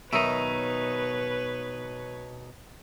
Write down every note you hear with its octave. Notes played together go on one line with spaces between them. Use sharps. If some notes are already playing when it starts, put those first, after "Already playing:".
B2 D#3 F#3 D#4 B4 C#5 E5